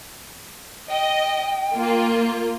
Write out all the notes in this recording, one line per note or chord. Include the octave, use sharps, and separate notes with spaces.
D#5 G5
A#3 F4